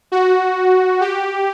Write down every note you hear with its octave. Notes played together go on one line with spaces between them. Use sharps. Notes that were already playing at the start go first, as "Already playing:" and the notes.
F#4
G4